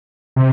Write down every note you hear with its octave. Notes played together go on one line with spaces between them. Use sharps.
C3